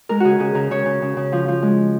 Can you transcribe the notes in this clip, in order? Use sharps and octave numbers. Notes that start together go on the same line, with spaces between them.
G#3 A#4
C#3 F#4 G#4
C#3 G#4
C#3 A#4
C#3 C#5
C#3
C#3
C#3
F3
F3
G#3